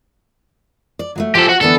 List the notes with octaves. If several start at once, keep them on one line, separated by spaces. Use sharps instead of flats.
D5
F#3 G#3 A3
F3 G4 A4 C5
F#4
D3 E3 B3 A4